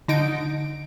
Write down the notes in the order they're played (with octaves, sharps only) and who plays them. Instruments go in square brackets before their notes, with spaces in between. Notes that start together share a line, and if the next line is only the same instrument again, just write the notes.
[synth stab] D3 D#4 D7